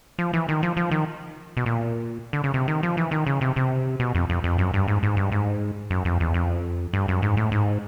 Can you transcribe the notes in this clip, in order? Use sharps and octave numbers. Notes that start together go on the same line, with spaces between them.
F3
E3
D#3
F3
F3
D#3
B2
A#2
D3
C#3
C3
D#3
F3
E3
D#3
C#3
C3
C3
B2
F2
F2
F2
F#2
G2
G#2
G#2
G2
G#2
F#2
F2
E2
F2
G2
F#2
G#2
A2
G#2